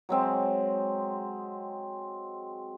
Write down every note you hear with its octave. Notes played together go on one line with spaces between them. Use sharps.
F#3 G#3 C4